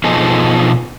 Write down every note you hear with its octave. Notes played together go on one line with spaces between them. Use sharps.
B2 F3 D#4 G#4 A4